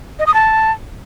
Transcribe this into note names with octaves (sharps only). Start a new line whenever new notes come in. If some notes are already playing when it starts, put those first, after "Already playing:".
D#5
D#6
A5